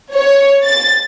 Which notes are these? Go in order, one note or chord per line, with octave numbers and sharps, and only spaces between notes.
C#5
A6